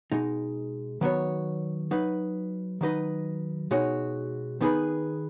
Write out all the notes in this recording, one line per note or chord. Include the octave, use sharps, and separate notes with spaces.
B2 G#3 D#4
D#3 F#3 B3 F#4 C#5
F#3 D#4 B4
D#3 F#3 D#4 B4 D#5
B2 G#3 D#4 F#4 C#5
D#3 B3 D#4 G#4 B4